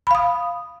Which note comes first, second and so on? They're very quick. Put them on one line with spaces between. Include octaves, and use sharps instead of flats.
B5 F5 D#6